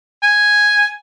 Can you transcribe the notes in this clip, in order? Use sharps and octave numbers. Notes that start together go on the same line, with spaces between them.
G#5